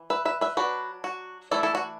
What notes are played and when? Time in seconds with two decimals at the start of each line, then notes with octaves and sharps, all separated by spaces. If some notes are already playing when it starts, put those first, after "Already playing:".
Already playing: E3
0.10 B4 E5
0.25 B4 E5
0.41 B4 E5
0.57 F#3 D4 F#4 B4
1.04 F#4
1.51 E3 A3 D4 E4 A4
1.63 E4 A4
1.75 F#4